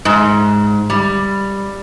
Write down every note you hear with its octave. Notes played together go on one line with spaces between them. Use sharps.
G#2
G3